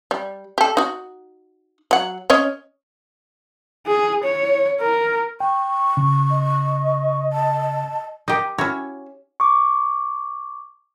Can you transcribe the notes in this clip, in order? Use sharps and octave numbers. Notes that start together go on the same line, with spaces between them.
G3
G4 A4
D#4 F#4
F#3 F#5
C#4 C#5 D#5
G#4
C#5
A#4
G5 C#6
C#3
D#5
A5
D#4 G4 A#4 D#5
C#4 E4 F#4 C#5
C#6 D6